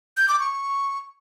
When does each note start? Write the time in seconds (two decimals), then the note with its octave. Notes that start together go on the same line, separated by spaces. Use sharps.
0.17 G6
0.29 D6
0.40 C#6